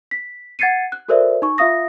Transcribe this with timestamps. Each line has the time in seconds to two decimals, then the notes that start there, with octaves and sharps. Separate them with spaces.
0.11 B6
0.59 F#5 G#6 A6 C7 C#7 D#7
0.92 F#6
1.09 F#4 A4 A#4 C5 D5 E5
1.42 D#4 C#6
1.58 F4 E5 F5 D#6 A#6